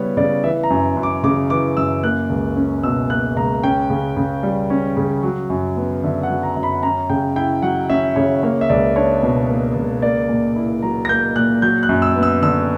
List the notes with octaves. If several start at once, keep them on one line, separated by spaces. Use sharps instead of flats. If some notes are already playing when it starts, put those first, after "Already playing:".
Already playing: C#3 G3 B3 E4 C#5
C#3 D5
E3 E5
A#5
F#2
F#2
D6
C#3 D6
E3 D6
F#2 E6
A#3 F#6
C#2
C#4
B2 E6
A#3 F#6
C#2 A#5
C#4 G5
C#3
C#3
G3
C#4
C#3
F#3
F#2
B3
D3 E5
F#5
F#3
A#5
F#2
B5
C#4 A#5
C#3 G5
E4 G5
F#3 F#5
C#4 E5
C#3 C#5
A#3 C#5
E5
C#2 D5
D4 C#5
B2
A#3
C#2
A#3 D5
A#2
E4
F#3 A#5
A#6
A#3 G6
A#2 F#6
F#3 G6
F#6
F#2
E6
B3
E6
D3 E6